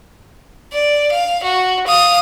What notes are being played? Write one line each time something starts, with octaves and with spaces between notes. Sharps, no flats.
D5
F5
F#4
F5 D#6